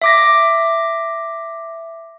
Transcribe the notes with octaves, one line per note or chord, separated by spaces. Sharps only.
E5 D6 A#6